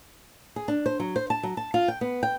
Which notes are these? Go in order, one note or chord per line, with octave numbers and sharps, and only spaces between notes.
G#4
D4
C5
F#3
C5
A5
F#3
A5
F4
G5
B3
G5